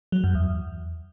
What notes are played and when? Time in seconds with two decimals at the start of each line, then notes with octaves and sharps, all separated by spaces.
0.12 F#3
0.24 F#2
0.35 E2